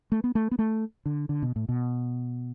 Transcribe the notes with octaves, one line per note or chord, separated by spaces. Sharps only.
A3
B3
A3
B3
A3
D3
D3
B2
A2
B2